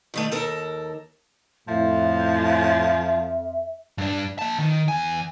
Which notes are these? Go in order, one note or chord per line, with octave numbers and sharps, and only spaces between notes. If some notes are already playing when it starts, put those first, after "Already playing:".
G2 D#3 A3
D#2 A4 A#4
F2 A2 F3 E5
G2 D4
A#3 A5
D#3
E2 G#5